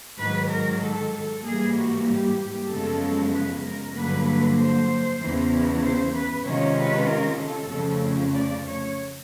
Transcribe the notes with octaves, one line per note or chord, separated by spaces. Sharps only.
G#2 D#3 F#3 B4
A#4
A4
G#2 E3 G3 A#3 G#4
F#4
G4
F#2 C#3 F3 G#3 B3 A4
B4
A#4
G2 D3 F#3 A#3 B4
C5
E2 C#3 E3
C5
B4
C3 D#3 G#3 C#4 F4 C#5
B4
A#4
A4
F2 C#3 F3 A3
D5
C#5